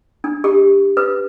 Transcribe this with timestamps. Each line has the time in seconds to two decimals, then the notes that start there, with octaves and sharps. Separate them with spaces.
0.24 D4
0.44 G4
0.97 B4